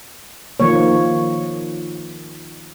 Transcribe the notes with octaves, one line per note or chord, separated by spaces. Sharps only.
D#3 F3 A#3 C#5